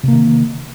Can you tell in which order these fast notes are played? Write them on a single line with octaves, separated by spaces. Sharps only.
C3 A#3 D#3